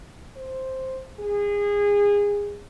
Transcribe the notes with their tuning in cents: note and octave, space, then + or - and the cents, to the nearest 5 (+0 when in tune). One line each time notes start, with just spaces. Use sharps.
C5 +5
G#4 -25